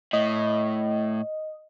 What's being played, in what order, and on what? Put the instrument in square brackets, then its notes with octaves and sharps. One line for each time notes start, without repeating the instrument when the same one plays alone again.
[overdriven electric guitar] A2 [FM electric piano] D#5